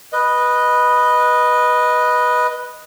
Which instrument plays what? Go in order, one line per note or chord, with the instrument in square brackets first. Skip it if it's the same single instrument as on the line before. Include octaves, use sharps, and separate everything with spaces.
[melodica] B4 D#5